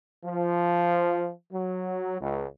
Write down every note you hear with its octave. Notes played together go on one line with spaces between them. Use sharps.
F3
F#3
C#2